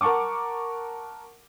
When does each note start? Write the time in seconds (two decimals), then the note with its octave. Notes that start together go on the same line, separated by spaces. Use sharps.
0.01 A#4 F#5 A5 C#6 D6